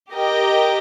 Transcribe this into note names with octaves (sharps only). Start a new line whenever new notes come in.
G4 A#4 D#5 G5